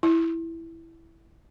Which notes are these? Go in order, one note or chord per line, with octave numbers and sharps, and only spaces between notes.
E4